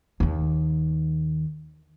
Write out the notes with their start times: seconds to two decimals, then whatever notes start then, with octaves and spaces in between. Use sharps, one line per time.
0.20 D#2 D#3